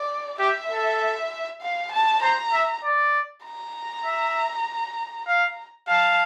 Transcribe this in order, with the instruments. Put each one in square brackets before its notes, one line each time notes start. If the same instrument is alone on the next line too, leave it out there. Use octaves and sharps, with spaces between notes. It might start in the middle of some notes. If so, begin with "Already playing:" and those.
Already playing: [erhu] D5
[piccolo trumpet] G4 [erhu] E5
[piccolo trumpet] A4
[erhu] F5
A5
[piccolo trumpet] C5 [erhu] A#5
[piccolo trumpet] E5
D5
[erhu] A#5
[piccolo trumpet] E5
F5
[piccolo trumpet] F5 [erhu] A5